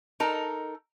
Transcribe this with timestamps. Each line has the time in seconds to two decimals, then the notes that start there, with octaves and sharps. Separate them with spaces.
0.20 D#4 A4 A#4